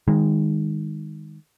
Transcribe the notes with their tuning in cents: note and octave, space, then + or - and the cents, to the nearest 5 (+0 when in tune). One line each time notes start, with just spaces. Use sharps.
D#3 +0 G#3 -25